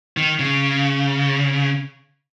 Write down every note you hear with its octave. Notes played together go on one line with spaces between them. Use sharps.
D#3
C#3